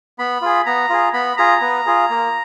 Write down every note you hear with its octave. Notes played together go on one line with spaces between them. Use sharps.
B3 B5
F4 G#4
B3 A#5
F4 G#4
B3 B5
F4 G#4 A#5
B3
F4 G#4
A#3